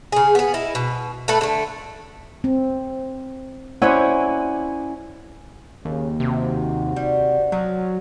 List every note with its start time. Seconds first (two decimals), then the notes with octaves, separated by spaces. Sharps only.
0.12 C#3 G#4
0.35 B3 G#4
0.54 D#4 E4
0.75 B2
1.28 A3 A4 B4
1.41 D3 A3
2.44 C4
3.82 C#4 E4 C5 D5 F#5 G#5
5.85 D#2 C#3
6.20 C3 F#4
6.96 G3
7.52 F3 F#3